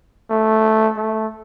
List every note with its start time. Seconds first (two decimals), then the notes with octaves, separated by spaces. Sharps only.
0.30 A3
0.97 A3